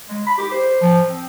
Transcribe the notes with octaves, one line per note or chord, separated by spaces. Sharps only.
G#3
B5
G4
C5
F3
C4